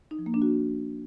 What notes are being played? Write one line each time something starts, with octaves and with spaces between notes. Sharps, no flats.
D#4
F3
A#3
D4
F#4